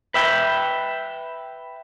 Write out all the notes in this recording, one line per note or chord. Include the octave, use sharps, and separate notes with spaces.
B4 E5 G5